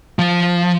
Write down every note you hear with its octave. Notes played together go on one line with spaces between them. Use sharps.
F3